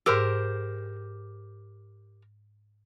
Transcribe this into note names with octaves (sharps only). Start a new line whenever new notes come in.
G#2 G4 A#4 C5 E6